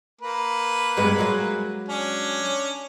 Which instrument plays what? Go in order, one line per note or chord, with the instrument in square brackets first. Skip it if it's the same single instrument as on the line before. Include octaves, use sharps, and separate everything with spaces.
[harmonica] A#3 B4
[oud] G2 G#3 B3
F#3 G#3
[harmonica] C#4 D4 C#5